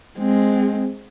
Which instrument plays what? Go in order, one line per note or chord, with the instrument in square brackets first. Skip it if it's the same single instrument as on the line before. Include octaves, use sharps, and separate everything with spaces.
[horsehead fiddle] G#3 C4